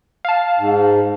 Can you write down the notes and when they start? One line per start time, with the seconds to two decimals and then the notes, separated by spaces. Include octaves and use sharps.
0.25 F5 A5
0.59 G#2